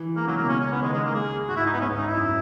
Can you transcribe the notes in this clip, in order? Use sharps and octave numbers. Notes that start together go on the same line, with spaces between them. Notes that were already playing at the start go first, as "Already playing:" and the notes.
Already playing: E3
G#3 A#3
C#3 F#3
B2 A#3
C#3 C#4
C#4
B3
D#3 G#3
G#3
A#3
G#4
G#2 F#4
E4
D#4
B3
G#2 C#4
D#4
E4
F#2